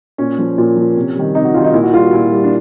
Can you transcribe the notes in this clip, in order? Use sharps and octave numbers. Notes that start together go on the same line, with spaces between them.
A#2 C#4
F3
A#2
F3
C3
D#3 G3
C3 D#4
F#4
D#3 G3 F4
D#4
A#2 E4
F#4
G3 F4
F#4
A#2 E4
G3
D4